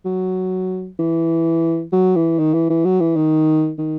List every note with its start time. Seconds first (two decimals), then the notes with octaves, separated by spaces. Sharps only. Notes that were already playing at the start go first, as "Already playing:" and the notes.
0.05 F#3
0.99 E3
1.93 F#3
2.16 E3
2.39 D#3
2.54 E3
2.70 E3
2.85 F#3
3.01 E3
3.16 D#3
3.78 D#3